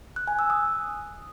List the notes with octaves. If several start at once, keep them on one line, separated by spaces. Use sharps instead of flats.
F#6
G#5
E6
D#6